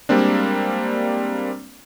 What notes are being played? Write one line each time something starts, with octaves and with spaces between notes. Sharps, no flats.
G3 G#3 A#3 C4 D4